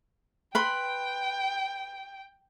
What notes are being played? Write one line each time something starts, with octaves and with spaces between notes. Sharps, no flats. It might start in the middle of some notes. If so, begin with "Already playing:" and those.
B4 G5 B5 C6